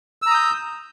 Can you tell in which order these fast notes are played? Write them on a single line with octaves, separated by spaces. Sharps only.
E6 A#5 D#6 G6